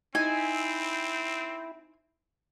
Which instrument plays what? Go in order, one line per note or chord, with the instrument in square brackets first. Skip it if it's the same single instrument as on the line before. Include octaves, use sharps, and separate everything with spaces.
[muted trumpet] C4 [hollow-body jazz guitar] D#4 [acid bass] E4 [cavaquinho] G#5